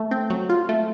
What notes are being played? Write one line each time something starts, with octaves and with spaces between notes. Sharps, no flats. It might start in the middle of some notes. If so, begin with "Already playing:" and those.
Already playing: A3
C4
F#3
F4
A3